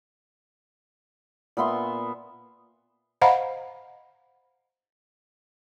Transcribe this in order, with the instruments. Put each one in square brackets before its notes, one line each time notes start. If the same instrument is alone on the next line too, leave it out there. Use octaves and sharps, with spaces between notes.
[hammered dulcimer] A#2 B3 E5 C6
[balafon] C5 D#5 F5 F#5 A#5 B5